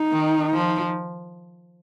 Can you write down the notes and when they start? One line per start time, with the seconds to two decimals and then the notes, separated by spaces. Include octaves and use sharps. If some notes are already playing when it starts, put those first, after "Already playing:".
Already playing: D#4
0.12 D#3
0.53 F3